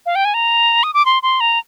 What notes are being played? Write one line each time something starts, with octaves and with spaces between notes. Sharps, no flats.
F5
G5
G#5
A#5
D#6
D6
C6
C6
A#5